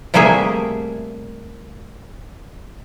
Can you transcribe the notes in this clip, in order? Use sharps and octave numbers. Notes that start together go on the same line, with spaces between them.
C3 G3 A3 A#3 G#4 E5